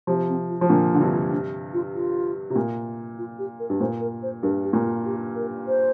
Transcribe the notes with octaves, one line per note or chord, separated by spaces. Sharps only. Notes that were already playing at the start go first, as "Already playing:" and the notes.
C3 F3 F4
C4
F4
F3
A#2 D3 D4
D3
G2 C3
F4
D4
F4
F4
C3
A#2
F4
G4
A#4
G2
A#2 C5
A#4
C5
G2 A#4
G4
A#2
F4
G4
A#4
C5